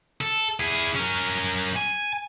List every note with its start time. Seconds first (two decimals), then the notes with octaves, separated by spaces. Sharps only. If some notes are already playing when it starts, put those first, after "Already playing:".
0.21 A4
0.60 E4 G#4
0.95 C#4 A#4
1.76 G#5